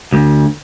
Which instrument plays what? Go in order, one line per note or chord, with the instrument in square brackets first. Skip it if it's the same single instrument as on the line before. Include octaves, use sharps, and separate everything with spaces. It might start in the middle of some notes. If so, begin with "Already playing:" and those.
[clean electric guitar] D2